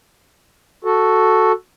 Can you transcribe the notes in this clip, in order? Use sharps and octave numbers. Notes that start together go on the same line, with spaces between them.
F#4 A4